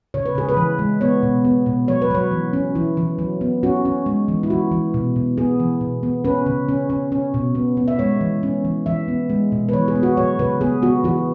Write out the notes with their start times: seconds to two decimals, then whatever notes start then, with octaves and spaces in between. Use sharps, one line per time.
0.14 C#3 C#5
0.25 B4
0.35 C#3 G#4
0.49 B4
0.57 E3
0.79 G#3
1.01 B3 C#5
1.23 B2
1.45 B3
1.66 B2
1.88 F#3 C#5
2.02 B4
2.11 F#3 C#5
2.31 E3
2.53 C#4
2.75 E3 E4
2.97 E3
3.19 F#3
3.41 B3
3.63 C#4 F#4
3.85 C#4
4.06 G#3
4.28 E3
4.43 E4
4.50 E3 F#4
4.72 E3
4.94 B2
5.16 B2
5.38 B3 G#4
5.60 E3
5.81 B2
6.03 B3
6.25 C#4 B4
6.46 C#3
6.69 C#4
6.90 C#4
7.12 C#4
7.34 B2
7.55 B3
7.77 B3
7.88 E5
7.99 G#3 C#5
8.21 E3
8.43 C#4
8.65 E3
8.86 E3 E5
9.08 B3
9.30 G#3
9.52 B2
9.69 B4
9.73 E3 C#5
9.88 G#4
9.96 B3
10.03 F#4
10.17 F#3 C#5
10.39 C#3 B4
10.61 B3 G#4
10.82 B3 F#4
11.04 E3 F#4